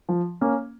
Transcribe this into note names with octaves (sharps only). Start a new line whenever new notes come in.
F3
A#3 C#4